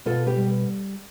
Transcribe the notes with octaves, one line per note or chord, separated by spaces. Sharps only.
B2 F4 A4
G4 B4
G3